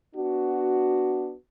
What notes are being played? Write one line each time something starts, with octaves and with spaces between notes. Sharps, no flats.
B3 D4 F#4